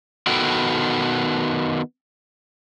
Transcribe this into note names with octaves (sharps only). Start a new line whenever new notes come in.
D#3 B3 F#4 A4 G5